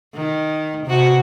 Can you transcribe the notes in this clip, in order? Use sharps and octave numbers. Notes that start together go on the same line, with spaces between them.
D#3
C3 F#4